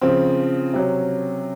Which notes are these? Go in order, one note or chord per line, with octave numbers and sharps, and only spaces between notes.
C#3 F3 C4
C3 F#3 C#4